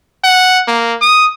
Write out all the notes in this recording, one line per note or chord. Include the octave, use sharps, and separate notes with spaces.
F#5
A#3
D#6